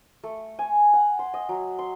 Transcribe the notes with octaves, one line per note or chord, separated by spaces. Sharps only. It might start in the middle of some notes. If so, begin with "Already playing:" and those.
A3
G#5
F#5
C6
D#5
F#3
C6